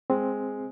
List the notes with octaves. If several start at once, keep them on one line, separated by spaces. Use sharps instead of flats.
G#3 C4